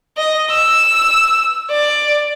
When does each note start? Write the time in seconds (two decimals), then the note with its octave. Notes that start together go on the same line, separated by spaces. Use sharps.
0.17 D#5
0.51 E6
1.71 D5